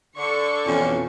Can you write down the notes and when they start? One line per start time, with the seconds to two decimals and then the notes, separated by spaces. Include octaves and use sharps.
0.17 D3 A4 C#6
0.66 F2 B2 E3 C#4